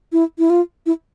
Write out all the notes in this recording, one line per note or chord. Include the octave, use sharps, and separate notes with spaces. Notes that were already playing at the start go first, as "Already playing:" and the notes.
E4
E4
F4
E4